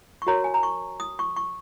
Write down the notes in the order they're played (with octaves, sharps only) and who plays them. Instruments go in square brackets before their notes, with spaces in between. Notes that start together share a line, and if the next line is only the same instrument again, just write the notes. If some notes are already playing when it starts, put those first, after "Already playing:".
[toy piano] C#6
F#4 A#4 C#5 A#5
G#5
A#5
C#6
D#6
C#6
C#6